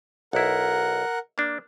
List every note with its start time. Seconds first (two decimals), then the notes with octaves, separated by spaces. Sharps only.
0.33 B1 E4 A#4 F#5
1.38 A#3 D4